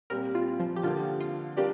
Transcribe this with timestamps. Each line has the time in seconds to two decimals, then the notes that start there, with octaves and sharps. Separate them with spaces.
0.10 A#2 G3 C4 G4 A#4
0.35 F4
0.60 F3
0.76 G4
0.83 D3 F3 A#3 F4
1.20 F4
1.57 G3 D4 F4 G4 A#4 D5